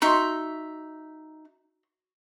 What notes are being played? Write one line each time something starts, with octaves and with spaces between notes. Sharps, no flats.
D#4 F#4 E5 C6